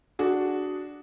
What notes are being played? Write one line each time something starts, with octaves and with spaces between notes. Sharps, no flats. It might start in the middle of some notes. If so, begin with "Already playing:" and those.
D4 F#4 G#4